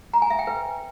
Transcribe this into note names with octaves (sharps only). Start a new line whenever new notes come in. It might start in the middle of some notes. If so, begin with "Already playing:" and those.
A#5
G#5
E5
G5
B4